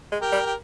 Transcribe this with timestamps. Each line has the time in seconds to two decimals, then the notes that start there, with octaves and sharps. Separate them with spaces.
0.12 G#3
0.22 G4 A#4
0.32 G3
0.46 G4